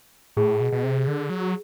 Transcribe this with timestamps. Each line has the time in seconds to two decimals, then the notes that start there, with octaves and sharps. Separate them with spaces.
0.37 A2 G#4
0.60 B2
0.72 B2
0.84 C3
1.07 D3
1.30 F#3